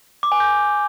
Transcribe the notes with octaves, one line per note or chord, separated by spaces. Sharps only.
D6
G#5
G6